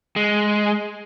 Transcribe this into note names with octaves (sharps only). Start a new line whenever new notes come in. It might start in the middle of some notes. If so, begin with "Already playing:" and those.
G#3